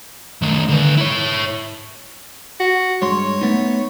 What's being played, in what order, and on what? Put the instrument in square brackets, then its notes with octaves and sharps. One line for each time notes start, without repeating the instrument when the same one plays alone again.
[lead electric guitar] D#3 A3
D3 B4
E4 C#5
[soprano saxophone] F#4
[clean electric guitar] G2 G#3 C6 [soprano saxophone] C#5
[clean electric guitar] A3 B3 D#4